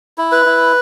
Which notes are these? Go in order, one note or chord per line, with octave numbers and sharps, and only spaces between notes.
E4
B4
E4